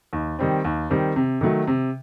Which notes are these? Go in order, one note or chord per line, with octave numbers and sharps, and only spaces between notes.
D#2
D#3 G3 C4
D#2
D#3 G3 C4
C3
D#3 F#3 A3
C3